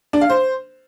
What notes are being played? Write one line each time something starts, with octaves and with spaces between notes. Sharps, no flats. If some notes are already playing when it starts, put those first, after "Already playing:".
D4
F5
C5